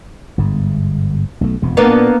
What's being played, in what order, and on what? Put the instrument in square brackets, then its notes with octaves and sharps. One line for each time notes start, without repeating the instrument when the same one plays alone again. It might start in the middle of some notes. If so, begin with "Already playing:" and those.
[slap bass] G1 G#2
B1 A3
E1 F2 C3
[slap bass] A#2 [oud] A#3 B3 D4